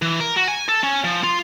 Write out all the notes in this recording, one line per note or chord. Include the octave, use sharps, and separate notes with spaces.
E3
A#4
F#4
G#5
A4
C#4
F3
F4